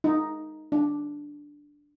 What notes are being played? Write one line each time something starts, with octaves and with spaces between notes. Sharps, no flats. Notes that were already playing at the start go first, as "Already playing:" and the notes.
D#4
D4